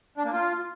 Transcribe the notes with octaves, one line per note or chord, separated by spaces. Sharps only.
D4
A#3
F4